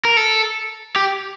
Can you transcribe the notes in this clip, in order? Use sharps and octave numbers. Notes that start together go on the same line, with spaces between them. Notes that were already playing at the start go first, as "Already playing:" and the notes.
A#4
A4
G4